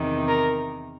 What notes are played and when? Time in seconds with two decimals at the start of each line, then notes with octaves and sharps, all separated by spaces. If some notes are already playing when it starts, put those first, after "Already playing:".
Already playing: E2 C3 D#3
0.28 A#4